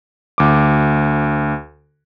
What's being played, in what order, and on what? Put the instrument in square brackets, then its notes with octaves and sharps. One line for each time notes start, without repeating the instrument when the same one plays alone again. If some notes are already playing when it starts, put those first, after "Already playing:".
[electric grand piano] D2 D6